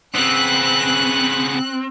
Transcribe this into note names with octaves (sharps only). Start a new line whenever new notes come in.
C#3 B3 C4 F#6